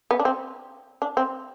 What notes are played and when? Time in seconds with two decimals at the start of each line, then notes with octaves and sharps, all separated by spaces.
0.11 B3
0.20 D4
0.25 C4
1.02 D4
1.17 C4